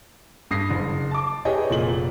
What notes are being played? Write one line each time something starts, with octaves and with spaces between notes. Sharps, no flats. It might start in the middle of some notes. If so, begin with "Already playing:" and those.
G2 D#6 A#6 C7
F#1
A5 D6
G4 G#4 B4 C#5 D#5
F1 A#2 F#7